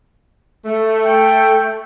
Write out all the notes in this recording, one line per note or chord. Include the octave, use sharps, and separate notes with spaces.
A3
G5